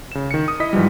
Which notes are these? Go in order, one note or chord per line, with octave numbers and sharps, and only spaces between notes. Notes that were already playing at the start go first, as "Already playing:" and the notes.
C#3 E7
D#3 C#7
D#6
E4 D#5 D#6 B6
G#2 E3 F3 G3